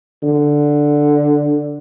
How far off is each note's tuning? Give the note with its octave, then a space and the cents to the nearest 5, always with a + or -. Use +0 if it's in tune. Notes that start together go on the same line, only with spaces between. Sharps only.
D3 +0